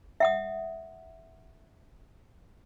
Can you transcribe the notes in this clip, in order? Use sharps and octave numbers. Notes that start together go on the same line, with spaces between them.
E5 F#5 D#6